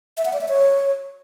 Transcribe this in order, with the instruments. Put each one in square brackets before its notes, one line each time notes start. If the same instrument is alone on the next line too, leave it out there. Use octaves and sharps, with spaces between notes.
[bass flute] E5
F#5
D5
E5
C#5